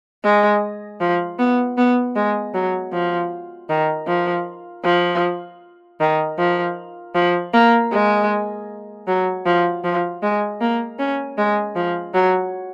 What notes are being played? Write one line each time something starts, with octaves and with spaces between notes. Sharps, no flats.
G#3
F3
B3
B3
G#3
F#3
F3
D#3
F3
F3
D#3
F3
F3
A#3
G#3
F#3
F3
F3
G#3
A#3
C#4
G#3
F3
F#3